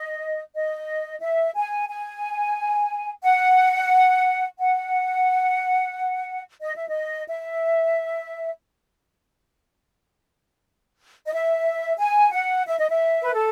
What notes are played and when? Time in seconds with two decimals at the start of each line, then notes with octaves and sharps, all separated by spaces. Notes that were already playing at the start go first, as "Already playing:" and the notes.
Already playing: D#5
0.54 D#5
1.21 E5
1.55 G#5
1.89 G#5
3.23 F#5
4.58 F#5
6.61 D#5
6.75 E5
6.88 D#5
7.27 E5
11.27 D#5
11.32 E5
11.99 G#5
12.33 F#5
12.67 E5
12.79 D#5
12.89 E5
13.23 B4
13.35 A4